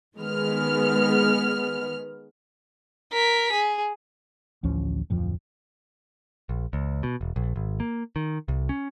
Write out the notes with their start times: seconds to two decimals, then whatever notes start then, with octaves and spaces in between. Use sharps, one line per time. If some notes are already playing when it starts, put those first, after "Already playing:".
0.17 D#3 G#3 B3 F6
3.12 A#4 B6
3.53 G#4
4.63 A1 D2 F3 C#4
5.10 D1 F2 F3
6.49 A#1
6.73 C#2
7.03 B2
7.21 E1
7.36 A#1
7.56 G#1
7.80 A#3
8.16 D#3
8.48 C2
8.69 C#4